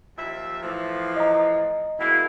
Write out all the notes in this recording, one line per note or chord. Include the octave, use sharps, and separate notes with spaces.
D#2 F3 E5
A2 E3 F3
D#5 A#5
B2 G#3 A#3 E4